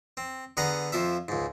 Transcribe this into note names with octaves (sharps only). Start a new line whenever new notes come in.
C4
D3 B3 G#4 F#5 A#5
F2 F3 C5 E5
C#2 G#2